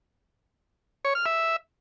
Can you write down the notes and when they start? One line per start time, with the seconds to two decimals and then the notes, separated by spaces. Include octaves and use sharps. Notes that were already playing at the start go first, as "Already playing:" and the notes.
1.05 C#5
1.15 F6
1.26 E5